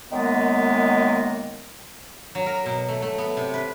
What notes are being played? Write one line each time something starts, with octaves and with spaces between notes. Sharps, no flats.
F#2 D#3 G#3 A#3 B3
F#3
A#4
B2
A3
A3
B3
C3
B4